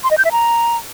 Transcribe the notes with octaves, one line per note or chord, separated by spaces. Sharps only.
C6
D#5
G6
E5
A#5